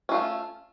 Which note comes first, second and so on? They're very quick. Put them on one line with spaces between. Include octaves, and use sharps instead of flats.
C#4 F4 A3